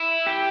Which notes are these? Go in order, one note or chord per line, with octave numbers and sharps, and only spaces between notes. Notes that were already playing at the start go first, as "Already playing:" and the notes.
Already playing: E4
G4